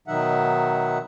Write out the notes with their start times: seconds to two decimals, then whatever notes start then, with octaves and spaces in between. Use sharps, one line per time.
0.08 B2 D#3 F#3 D#4 E5 F#5